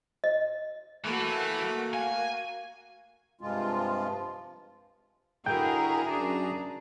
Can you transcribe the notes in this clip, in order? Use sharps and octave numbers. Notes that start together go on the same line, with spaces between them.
D#5
E3 A3 A#3 F#4
F5 G#5
G2 C3 F3 G#3 F4
D3 E4 F#4 G#4 A#4 E5 G5
F#2 D4 A#5